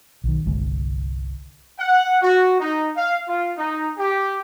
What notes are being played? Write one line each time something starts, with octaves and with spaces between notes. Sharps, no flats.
B1 D#3
G1 C2 D3 G#3
F#5
F#4
D#4
F5
F4
D#4
G4